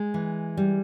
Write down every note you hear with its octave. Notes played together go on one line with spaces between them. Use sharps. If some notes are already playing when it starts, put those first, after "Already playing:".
Already playing: G#3
E3
G3